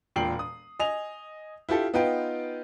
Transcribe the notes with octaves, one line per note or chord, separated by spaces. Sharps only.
E1 A#2 G5 C7 F#7
D#6
D#5 G#5 F7
E4 F4 G4 A4
B3 D#4 F4 B4 G5